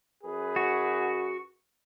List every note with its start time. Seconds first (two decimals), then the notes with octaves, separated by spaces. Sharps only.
0.24 F#2 G#4 B4
0.56 F#4